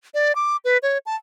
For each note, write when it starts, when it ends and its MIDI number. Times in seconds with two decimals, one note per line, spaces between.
0.14 0.35 74
0.35 0.57 86
0.65 0.78 71
0.83 0.98 73
1.06 1.16 81